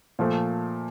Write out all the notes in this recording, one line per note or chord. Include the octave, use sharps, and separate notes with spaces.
A#2 F3 A3